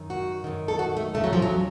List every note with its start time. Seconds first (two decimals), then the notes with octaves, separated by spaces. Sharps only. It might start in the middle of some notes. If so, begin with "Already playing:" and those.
Already playing: F#2 D#3
0.10 F#4
0.44 F#2 D#3
0.68 A4
0.79 F#4
0.97 A3
1.14 D#2 C#3 A3
1.24 F#3
1.33 F3
1.42 F#3